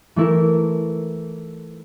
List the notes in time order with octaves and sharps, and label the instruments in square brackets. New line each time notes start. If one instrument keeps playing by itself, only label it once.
[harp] E3 A3 E4 A#4